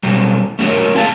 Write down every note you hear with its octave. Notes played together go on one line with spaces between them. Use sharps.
B2 F#3 G3
A3 C#4 F#4 A#4 C#5
C4 G#4 F5 A5